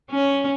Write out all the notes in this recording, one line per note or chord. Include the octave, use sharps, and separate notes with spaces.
C#4